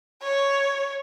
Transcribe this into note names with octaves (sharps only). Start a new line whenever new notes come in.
C#5